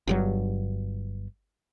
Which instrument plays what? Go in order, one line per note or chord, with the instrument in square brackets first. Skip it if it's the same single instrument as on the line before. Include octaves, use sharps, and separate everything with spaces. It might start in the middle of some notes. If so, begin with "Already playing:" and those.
[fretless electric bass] G1 G2 F#3